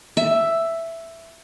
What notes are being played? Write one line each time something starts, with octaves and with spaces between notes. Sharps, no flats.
E5